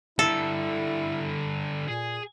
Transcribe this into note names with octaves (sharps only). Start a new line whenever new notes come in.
D3 G3 E4 A4
A#2 G#4